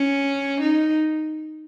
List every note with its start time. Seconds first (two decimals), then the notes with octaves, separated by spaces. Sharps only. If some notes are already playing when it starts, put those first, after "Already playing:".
Already playing: C#4
0.61 D#4